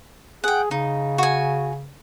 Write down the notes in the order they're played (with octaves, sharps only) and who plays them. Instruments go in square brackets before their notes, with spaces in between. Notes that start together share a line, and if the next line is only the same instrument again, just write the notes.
[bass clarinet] G#4 [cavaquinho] F#5 G5
[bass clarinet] C#3 [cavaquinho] D#4
[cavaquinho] F#4 G#5